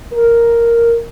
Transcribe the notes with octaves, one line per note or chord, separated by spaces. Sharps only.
A#4